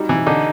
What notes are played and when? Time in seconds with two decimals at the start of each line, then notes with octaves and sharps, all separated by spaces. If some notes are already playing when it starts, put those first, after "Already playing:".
Already playing: F#3 G3 D#4
0.09 E3
0.26 D3 D#4